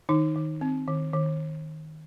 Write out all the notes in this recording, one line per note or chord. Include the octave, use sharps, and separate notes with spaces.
D#3 D#4
D#3
C4
D#3
D#3